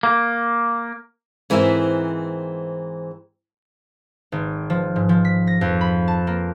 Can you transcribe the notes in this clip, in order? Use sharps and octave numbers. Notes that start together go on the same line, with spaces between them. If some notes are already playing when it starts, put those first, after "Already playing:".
A#3
G#2 E3 C4 A#4 E5
G#1
F3
G#2
F3
B6
A#6
F2
B5
A5
A#3